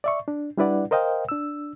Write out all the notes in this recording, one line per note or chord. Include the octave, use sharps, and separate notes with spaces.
D5 E5 C#6
D4
G3 D4 E4 B4 D5 F#5
A#4 C5 D#5 F5 G5
D4 E6